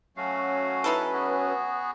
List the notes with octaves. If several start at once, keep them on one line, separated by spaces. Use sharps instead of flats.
F#3 A3 C#4 F#4 F5
D#4 E4 A4 B4
B3 F#4 G#4